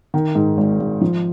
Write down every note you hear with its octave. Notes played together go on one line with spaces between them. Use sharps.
D#3
G#2
G#1
G#1
F3